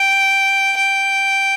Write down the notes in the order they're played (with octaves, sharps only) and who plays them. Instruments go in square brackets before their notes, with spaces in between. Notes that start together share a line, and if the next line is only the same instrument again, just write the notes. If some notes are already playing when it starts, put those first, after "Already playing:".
Already playing: [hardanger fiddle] G5
G5